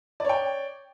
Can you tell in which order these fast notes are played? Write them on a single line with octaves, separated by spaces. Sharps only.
D5 C#5 G5